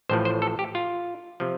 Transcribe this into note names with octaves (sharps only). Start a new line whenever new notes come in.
A1 A2 F3 C5
C5
A4
G4
F4
C3 F3